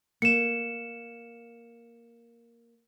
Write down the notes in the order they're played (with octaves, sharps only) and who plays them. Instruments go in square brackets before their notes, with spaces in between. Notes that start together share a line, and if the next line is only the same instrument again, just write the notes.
[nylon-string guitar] A#3 [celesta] C#7 E7